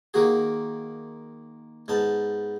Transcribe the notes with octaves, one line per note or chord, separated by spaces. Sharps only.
D#3 A#3 F#4 G#4
G#2 B3 A5